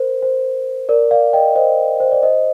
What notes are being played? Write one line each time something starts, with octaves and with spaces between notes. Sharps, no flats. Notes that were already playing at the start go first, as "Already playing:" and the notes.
Already playing: A#4 C5
C5
A#4 D5
D5 F5
D#5 G5
C5 D#5
C5
D5
C5 D#5